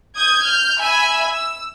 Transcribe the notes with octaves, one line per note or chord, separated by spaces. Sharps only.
D#6 G6 G#6
F6 G6
E5 G#5 B5 E6
E6